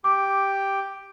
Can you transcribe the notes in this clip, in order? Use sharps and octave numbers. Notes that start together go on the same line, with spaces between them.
G4 G5 D6